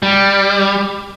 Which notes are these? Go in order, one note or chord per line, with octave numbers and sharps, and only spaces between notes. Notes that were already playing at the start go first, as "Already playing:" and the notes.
G3